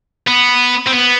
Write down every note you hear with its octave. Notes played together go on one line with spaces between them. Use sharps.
B3
C4
B3